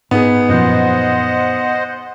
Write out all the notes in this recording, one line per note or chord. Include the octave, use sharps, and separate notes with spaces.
G#2 B3 D#4 G#4
F#2 A#2 F3 C5 D#5 F#5